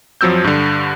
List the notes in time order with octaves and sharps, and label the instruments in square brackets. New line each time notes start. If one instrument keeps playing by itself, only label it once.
[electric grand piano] F2 F3 F#3 C4 E6 G6
G2 D3